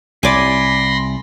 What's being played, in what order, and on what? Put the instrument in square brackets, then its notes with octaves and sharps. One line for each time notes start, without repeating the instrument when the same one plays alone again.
[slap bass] C2 [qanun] D5 G#5 [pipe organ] B5 C6 A#6